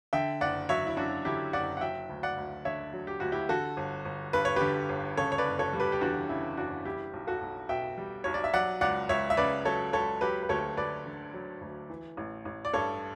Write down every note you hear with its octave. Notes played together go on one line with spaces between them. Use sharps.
D3 E5 G5
F#1 D5 F#5
F#3 C#5 E5
E4
F#2 D4 F#4
D3 E4 G4
F#1 D5 F#5
F#5
F#3 E5 G5
D2
D5 F#5
D2
D3 C#5 E5
F#3
G4
D2 F#4
E4 G4
D3 F#4 A4
G1
G1
G2 B4
C#5
D3 G4 B4
G1
C#3 A4 C#5
C#5
B4 D5
F#1
A4 C#5
G3
G4 B4
G4
E2 D4 F#4
C#3 E4
F#1 D4 F#4
G3 E4 G4
B1
F#4 A4
B1
B2 E5 G5
G3
B1 C#5
D5
E5
F#3 D5 F#5
C#2 D5 F#5
C#2 C#5 E5
E5
C#3 B4 D5
F#3 A4 C#5
C#2 A4 C#5
F#3 G4 B4
B4
D2 A4 C#5
D2 B4 D5
D3
F#3
D2
E3
A1
A1
D5
G2 A4 C#5